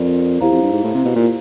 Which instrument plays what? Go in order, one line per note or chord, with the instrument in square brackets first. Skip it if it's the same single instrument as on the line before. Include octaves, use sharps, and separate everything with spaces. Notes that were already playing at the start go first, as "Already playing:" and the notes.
Already playing: [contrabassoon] F2 [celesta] A#4 D5
[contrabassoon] E2 [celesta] E4 G4 C5 F5 A#5
[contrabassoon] F2
G2
G#2
A2
C3
B2
A#2